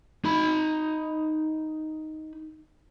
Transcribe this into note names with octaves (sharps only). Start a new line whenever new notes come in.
D#4 B5